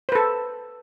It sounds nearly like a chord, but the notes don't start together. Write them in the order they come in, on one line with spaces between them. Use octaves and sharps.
C5 B4 A4